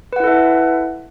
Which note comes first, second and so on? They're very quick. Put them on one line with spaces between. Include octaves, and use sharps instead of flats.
B4 F#5 E4 A4 E5